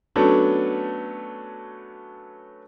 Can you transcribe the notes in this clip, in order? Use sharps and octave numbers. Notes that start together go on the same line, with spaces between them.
F#3 A3 B3 C#4 D4